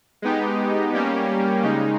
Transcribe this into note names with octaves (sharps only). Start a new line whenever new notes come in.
G#3 B3 D#4 G4
G3 A#3 C#4 G4
C#3 G#3 D#4